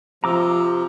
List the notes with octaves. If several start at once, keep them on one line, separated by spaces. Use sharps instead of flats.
C3 F3 A#5 D6 E6